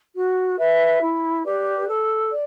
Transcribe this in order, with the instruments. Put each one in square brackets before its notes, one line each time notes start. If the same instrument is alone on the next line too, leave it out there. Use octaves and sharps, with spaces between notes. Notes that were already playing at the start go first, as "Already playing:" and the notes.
[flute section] F#4
B4 E5
E4
G4 B4 D5
A4
D5